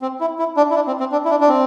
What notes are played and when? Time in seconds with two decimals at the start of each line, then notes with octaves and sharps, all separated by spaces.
0.02 C4
0.21 E4
0.39 E4
0.57 D4
0.70 E4
0.75 D4
0.87 C4
1.00 C4
1.12 D4
1.25 E4
1.30 D4
1.40 D4
1.49 C4